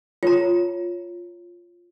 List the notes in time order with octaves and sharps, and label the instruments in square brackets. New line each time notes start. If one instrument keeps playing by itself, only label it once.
[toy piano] F4 A#5 [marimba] C#5